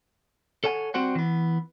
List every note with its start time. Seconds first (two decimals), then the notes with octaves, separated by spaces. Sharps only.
0.64 A4 C#5 F#5 G#5
0.94 G3 C4 F#4 C5 F#5
1.15 E3 B3